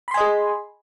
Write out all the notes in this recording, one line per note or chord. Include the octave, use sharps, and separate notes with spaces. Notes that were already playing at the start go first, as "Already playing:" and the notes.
G#4 D#5 G#5 B5 C6